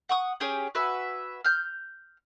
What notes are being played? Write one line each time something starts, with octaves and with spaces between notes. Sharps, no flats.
F#5 C#6 D#6
C#4 G4 G#4 C#5
F#4 B4 E5 G#5
F6 G6